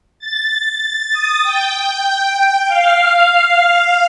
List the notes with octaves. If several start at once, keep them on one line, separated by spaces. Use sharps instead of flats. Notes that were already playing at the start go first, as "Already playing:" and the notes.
A6
D#6
G5
F5